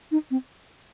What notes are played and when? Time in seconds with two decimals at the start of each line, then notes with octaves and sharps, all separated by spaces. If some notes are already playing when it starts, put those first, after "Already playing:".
0.12 D#4
0.31 C4